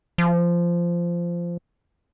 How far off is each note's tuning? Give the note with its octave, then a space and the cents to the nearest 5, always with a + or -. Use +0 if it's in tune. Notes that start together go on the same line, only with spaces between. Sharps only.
F3 -15